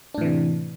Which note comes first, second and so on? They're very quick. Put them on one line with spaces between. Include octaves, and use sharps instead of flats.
D4 A2 E3 C3